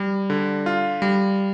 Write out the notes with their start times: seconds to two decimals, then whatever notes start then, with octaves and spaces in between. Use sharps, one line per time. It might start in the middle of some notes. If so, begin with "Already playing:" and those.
Already playing: G3
0.30 D3
0.66 F4
1.02 G3